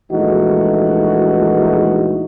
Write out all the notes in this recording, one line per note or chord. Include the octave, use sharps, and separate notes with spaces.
A#1 E3 G#3 A3 D#4 F#4